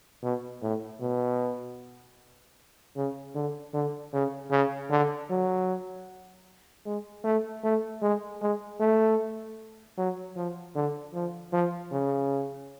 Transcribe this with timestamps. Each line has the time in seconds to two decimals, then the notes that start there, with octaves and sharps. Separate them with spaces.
0.23 B2
0.62 A2
1.01 B2
2.96 C#3
3.35 D3
3.74 D3
4.13 C#3
4.51 C#3
4.90 D3
5.30 F#3
6.85 G#3
7.24 A3
7.63 A3
8.02 G#3
8.41 G#3
8.80 A3
9.97 F#3
10.36 F3
10.75 D3
11.14 F3
11.53 F3
11.91 C#3